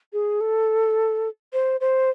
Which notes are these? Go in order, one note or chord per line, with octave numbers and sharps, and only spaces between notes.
G#4
A4
C5
C5